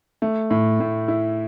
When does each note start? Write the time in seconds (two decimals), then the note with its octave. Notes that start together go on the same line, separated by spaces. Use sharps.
0.22 A3
0.50 A2
0.80 A2
1.08 E4